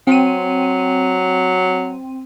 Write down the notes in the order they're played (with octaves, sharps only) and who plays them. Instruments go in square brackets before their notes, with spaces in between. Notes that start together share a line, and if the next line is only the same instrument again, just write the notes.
[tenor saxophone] F#3 [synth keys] C4 D#7